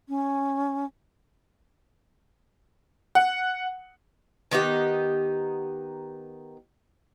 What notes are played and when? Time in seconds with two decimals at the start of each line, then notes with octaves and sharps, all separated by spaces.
0.09 C#4
3.15 F#5
4.51 D#3 B3 D#4 G4